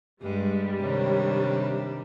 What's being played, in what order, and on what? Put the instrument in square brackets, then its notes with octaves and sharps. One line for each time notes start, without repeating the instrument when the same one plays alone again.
[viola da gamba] G2 G#3 [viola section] G3
[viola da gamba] C3 D#3 D4 [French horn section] C#5